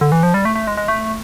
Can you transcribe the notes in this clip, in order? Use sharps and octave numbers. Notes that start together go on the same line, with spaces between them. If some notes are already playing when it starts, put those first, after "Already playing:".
D3
E3
F3
G3
A3
A3
G#3
G#3
A3